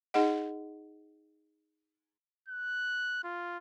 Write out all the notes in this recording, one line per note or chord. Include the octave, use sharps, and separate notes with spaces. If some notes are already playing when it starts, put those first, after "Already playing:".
D#4 G#4 D#5 F#5
F#6
F4